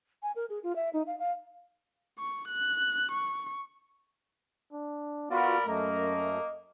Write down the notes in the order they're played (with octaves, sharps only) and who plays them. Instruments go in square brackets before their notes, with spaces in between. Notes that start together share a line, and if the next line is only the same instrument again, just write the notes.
[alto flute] G#5
A#4
G#4
F4
E5
D#4
F5
F5
[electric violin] C#6
F#6
C#6
[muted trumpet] D4
[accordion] B3 F4 F#4 [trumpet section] A#4 D5 B5 [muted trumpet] F5
[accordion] F#2 A3 [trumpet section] A#3 A#4 [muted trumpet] D#5